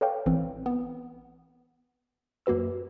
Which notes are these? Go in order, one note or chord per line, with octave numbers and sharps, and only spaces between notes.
A4 B4 C#5 D5 F5 G5
A1 E3 C4
B3
F#2 A#3 F#4 B4 E6